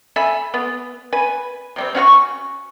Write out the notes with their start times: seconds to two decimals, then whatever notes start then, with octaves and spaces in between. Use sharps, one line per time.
0.16 A4 E5 G#5 B5
0.54 B3
1.13 B4 G#5
1.76 C3 G3 C4
1.95 C#4 F#4 F#5 C#6